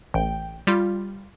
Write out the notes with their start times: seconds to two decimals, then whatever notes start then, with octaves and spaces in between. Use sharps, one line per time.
0.14 A1 G5
0.67 G3 F4